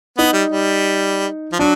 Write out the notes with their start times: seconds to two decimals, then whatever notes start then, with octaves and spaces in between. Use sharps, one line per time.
0.18 B3 D#4
0.33 G3
0.49 G3
1.52 F3
1.59 F#3 D4